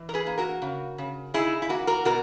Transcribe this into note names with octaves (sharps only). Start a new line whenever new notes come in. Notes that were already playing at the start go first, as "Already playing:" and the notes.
Already playing: E3
A#4
G#4 B4
A#3
F#4 A#4
C#3
C#3
D#4 E4 G#4
E4
A#3 F#4
F#4 A#4
B2 F#4 A#4